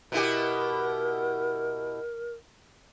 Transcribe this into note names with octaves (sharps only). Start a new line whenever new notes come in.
B2 E4 G4 A#4